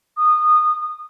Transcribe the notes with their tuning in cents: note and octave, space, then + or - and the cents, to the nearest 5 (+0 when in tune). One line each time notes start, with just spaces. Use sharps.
D#6 -20